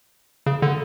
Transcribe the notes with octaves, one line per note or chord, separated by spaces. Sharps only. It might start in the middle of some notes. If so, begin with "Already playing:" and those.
C#3
D3